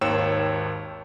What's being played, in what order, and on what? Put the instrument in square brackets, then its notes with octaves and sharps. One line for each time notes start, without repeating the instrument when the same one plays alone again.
[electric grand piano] G#1 D#2 C#5 G5 E6 E7